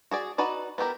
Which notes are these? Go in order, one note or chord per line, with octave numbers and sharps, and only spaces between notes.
F#4 G#4 D5
D#4 F#4 B4 D5
B3 E4 G4 A#4